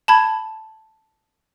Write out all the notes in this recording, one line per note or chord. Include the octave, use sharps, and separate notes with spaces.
A5 B5 G#6